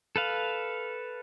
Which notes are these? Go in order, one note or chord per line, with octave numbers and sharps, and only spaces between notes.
A4 B4 F5